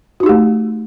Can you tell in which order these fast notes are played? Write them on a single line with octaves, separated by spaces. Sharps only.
F#4 D#4 G4 A3